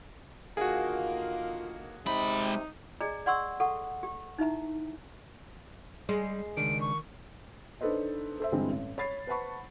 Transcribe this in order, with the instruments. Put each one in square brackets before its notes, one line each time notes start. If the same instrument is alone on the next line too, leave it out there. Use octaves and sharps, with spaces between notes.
[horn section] D3 D#3 A#3 [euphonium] F4 [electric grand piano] F#4 G#4
[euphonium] C3 [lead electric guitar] G#3 B5 [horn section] D#4
[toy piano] G#4 D5 D#5 G#5 A#5
D5 F#5 C6 C#6 E6
A4 F#5 C#6
G4
D#4 E4 E5 A#5
[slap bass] G3 [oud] G#3
[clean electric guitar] C#2 D4 [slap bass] D#3 [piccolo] D7
[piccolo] C#6
[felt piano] D4 D#4 A4 B4 C5 D#5
A4 C5 E5
G2 D3 E3 G3 G#3 C4
A1
C#5 B5 A6 C7
B4 C5 F#5 A5 B5 C#6